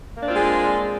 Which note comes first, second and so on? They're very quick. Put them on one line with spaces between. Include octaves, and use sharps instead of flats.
A#3 D4 C4 F4 G#3